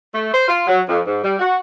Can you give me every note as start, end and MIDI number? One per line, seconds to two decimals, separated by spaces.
0.13 0.30 57
0.34 0.45 72
0.48 0.64 65
0.67 0.80 54
0.88 1.01 41
1.07 1.22 44
1.22 1.35 55
1.39 1.58 66